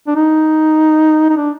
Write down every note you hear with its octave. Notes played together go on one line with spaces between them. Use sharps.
D4
D#4
D#4
D4